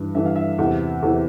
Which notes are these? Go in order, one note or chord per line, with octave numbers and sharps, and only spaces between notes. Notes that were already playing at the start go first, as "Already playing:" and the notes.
Already playing: G2 E3
G2 E3 E5
F5
E5
E2 C3 E3
E2 C3 E3